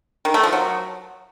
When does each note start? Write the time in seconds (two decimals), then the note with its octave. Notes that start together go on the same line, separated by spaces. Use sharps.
0.25 D#3
0.34 A3
0.43 F3
0.53 F#3